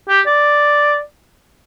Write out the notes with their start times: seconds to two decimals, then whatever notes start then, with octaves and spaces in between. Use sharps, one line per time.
0.09 G4
0.27 D5